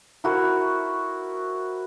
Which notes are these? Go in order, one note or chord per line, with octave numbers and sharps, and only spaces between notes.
E4 F#4 A#4 C5